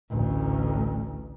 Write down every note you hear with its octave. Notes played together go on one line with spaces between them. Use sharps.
A1 D2